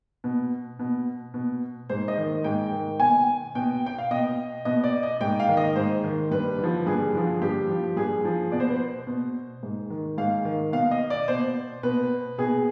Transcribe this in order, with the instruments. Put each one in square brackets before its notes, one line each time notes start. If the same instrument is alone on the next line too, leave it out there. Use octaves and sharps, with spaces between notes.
[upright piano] B2
B2
B2
G#2 C5
D#5
D#3
G#2 G5
D#3
B2 G#5
B2 G5
G5
F5
B2 D#5
B2 D#5
D5
D#5
G#2 G5
F5
D#3
D#5
G#2 C5
D#3
G2 B4
D3 F3
G2 G#4
D3 F3
G2 G4
F3
G2 G#4
F3
B2 D5
C5
B4
C5
B2
G#2
D#3
G#2 F5
D#3
B2 F5
D#5
D5
B2 C5
B2 B4
B2 G#4